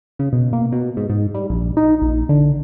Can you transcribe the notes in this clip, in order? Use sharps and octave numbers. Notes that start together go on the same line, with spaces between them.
C#3
B2
A#3
B2
G#2
G#2
G3
A#1
D#4
A#1
D3